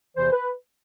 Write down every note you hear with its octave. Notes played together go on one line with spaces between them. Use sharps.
E2 C3 E3 C5
B4